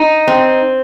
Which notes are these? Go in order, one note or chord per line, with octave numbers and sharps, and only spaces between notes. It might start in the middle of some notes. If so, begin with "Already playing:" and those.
Already playing: D#4
C4